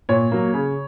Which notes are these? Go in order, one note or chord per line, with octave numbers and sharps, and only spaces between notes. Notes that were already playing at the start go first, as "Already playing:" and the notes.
A#2 C#5
F#3 A#3
C#3